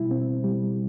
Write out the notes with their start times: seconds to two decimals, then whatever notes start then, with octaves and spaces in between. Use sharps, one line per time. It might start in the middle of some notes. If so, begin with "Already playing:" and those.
Already playing: B2 G3 E4
0.11 C4
0.44 G3